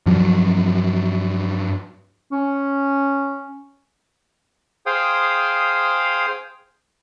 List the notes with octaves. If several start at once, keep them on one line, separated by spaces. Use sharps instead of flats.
G2 F3 F#3
C#4
G#4 C5 F5 G5 D#6